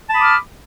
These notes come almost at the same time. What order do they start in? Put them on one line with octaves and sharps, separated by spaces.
A5 B5 D#6 D6 F6